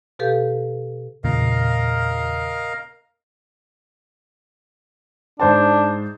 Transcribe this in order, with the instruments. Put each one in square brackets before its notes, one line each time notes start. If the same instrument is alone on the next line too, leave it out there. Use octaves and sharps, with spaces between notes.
[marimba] B2 G4 A4 B4 F5 G6
[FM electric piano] E2 A#2 C#3 [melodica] A#4 D#5 F5
[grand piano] G#2 C5 A5 [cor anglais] D4